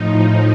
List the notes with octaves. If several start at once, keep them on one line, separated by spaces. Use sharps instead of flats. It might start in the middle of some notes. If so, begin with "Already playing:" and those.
Already playing: A2 F3 D#4